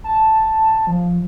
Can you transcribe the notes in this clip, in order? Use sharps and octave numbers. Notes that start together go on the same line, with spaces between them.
A5
F3